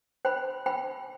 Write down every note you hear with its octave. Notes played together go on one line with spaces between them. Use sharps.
C5 G5 B5
C5 G5 B5